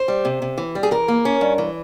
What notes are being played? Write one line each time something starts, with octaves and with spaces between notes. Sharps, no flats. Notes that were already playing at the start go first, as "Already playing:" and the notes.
Already playing: C5
G3
C3
C3
E3
G3
G#4
E3 A#4
A#3
C#4
G2
E3